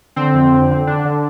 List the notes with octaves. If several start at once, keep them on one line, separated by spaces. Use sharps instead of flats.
D3 C4
F2
D3
D3
D3 D4
D3